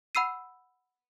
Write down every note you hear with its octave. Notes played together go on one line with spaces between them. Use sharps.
F#5 B5 E6 C7 D#7